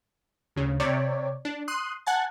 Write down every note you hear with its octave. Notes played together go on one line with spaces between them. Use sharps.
D2 C#3
C3 C#5 D5
D4
C6 D#6 F#6
F#5 G#5 A5